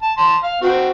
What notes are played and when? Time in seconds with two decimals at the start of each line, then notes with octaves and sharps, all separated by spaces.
0.02 A5
0.18 A5 C6
0.43 F5
0.61 C4 F#4